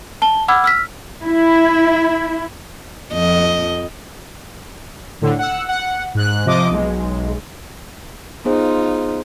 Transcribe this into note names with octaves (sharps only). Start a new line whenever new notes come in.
A5 G7
F#5 B5 D6 E6 F6 G#6
E6 F6 B6
E4
F2 F3 D#5
A2 D3
F#5 E6
F#5
G#2 F#6
C3 F3 D#5 D6
B1 G#3
B3 D#4 F4 G#4 C5